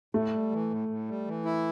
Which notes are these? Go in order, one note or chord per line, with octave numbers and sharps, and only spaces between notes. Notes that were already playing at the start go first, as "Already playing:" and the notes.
A2 A3
G3
E3
A2
A2
G3
E3
E4